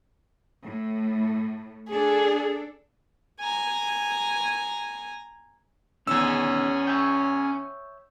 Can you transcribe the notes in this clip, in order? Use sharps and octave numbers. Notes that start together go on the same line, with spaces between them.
A2
D4 G#4 A4
G#5 A#5
E2 B2 D3 D#3 C#4 E6
C#5 E5 G5